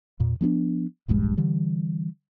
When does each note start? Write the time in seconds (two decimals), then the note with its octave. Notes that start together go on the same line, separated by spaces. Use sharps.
0.20 E2 A#2
0.41 F3 B3 C#4 D4
1.08 D1 A#1 G2 G#3
1.37 D3 E3 G3